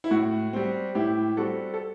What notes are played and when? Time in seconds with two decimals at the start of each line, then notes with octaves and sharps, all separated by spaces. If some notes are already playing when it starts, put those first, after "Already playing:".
0.04 E4
0.11 A2 F#4
0.53 G3 C4
0.95 A2 E4 G4
1.37 G3 C4 F#4 A4
1.74 A4